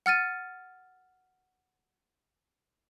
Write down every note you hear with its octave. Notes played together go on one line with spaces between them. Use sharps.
F#5 F6 A6 D#7